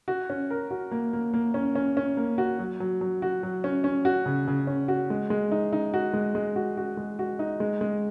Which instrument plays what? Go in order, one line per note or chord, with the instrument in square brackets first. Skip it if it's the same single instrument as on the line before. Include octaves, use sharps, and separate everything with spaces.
[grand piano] F#4
C#4
A#4
F#4
A#3
A#3
A#3
C#4
C#4
C#4
A#3
F#4
F#3
F#3
F#3
F#4
F#3
C#4
C#4
F#4
C#3
C#3
C#4
F#4
G#3
G#3
D#4
D#4
F#4
G#3
G#3
F#4
F#4
G#3
F#4
D#4
G#3
G#3